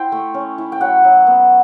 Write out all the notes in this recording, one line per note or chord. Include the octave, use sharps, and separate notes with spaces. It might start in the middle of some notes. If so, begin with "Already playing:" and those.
Already playing: E4 C5 G5
A3
C#4
E4
G5
F#3 F#5
F#3
B3